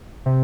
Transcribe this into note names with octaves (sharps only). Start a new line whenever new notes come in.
C3